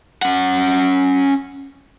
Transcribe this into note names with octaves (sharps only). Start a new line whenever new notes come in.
C#4 F#5